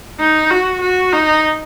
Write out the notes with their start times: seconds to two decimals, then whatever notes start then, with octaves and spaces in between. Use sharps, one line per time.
0.20 D#4
0.51 F#4
0.81 F#4
1.13 D#4